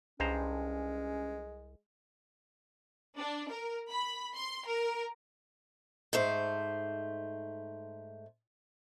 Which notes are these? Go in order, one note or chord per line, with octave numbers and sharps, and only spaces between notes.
C2 G2 G#3 C#4 C5 A#5
D4
A#4
B5
C6
A#4
G#2 A3 C5